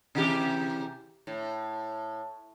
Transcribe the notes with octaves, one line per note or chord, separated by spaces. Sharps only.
C3 E3 G4
A2